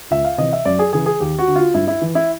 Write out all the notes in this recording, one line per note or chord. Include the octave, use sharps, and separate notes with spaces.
C#2 E5
F5
C3 E3 D#5
E5
F#2 D5
G#4
C#3 E3 G#4
G#4
D#2 G4
F#4
D3
F4
G2 E4
E4
E3
E4